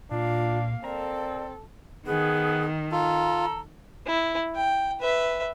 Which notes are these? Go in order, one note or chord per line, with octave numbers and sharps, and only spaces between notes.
A#2 A#3 D4 F4 F5
C4 A4 A#4 D5 F5 A#5
D#3 B3 G#4
F4 A4 A#5
E4
G5
B4 E5